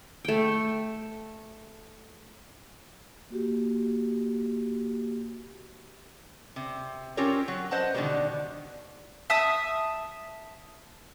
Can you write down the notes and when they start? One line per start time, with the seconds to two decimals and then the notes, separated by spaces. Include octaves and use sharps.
0.25 A3 G5
3.30 A#3 F#4 G4
6.56 C3
7.17 C4 C#4 F4 G4 A#4 C#5
7.48 F#3
7.71 B4 C5 D#5 F#5 A5
7.94 B2 D3 D#3 F#3 G3 A#3
9.30 E5 A5 D#6